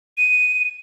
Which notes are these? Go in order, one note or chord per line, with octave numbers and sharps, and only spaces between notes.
D#7